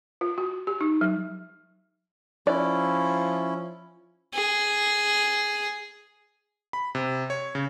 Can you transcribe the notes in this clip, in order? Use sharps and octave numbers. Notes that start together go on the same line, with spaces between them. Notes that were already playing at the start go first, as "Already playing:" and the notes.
F4
F#4
G4
D#4
F#3
F3 C#4 E4 D5
G#4
B5
C3
C#5
C#3